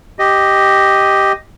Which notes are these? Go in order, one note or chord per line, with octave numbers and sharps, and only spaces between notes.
G4 D#5